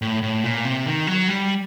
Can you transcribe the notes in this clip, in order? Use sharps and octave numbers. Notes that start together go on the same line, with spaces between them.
A2
A2
A#2
C3
D#3
F#3
G3